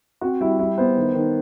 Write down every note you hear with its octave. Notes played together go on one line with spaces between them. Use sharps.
C4 F#4
G3 E4
G3 E4
B3 C5
D#3
D#3